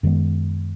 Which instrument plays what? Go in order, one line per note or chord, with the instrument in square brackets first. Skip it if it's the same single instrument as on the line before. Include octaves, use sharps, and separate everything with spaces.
[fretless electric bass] F#2 D#3 G#3 B3